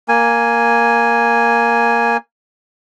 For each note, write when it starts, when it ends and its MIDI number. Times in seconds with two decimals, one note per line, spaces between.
0.08 2.17 58
0.08 2.17 80